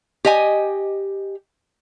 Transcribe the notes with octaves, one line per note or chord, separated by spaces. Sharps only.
G4 D#5 G#5